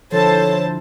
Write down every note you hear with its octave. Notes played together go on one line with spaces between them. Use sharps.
D3 F3 E4 A4 C5 C#5 A5